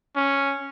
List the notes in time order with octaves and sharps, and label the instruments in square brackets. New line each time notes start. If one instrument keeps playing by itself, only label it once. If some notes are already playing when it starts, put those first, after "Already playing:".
[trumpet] C#4